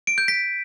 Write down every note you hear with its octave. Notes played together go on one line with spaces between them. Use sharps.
D7
G6
B6